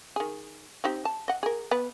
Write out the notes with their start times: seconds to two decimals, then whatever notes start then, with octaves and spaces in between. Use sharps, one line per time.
0.16 D#3 G#4
0.84 C4 D#4 G4
1.05 A5
1.28 D#5 F#5
1.43 G#4 A#4
1.71 B3 B4